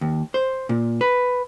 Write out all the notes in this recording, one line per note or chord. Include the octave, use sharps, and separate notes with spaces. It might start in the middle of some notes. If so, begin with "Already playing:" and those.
D#2
C5
A#2
B4